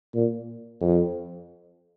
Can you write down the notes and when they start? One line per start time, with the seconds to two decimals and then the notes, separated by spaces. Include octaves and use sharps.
0.15 A#2
0.81 F2